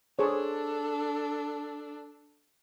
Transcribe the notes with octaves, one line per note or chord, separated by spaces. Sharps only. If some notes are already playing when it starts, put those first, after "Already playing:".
D4 G#4 A4 C5 C#5